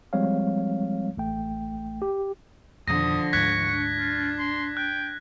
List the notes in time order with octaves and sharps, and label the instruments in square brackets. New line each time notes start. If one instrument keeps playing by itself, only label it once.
[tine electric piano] F3 G3 G#3 C4 C#5 F5
A1 A3 G5
G4
[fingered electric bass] F2 B2 D#3 [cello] D3 F3 [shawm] D#6 [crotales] A#6
[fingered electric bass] D2 G#2 [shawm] C#6 [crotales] F#6 G#6 B6
[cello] D4
[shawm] F4
C6
[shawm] G5 [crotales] F#6